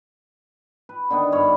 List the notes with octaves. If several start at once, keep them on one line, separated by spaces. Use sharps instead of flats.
B4
D3 D#3 B3
G2 C#5 F5 B5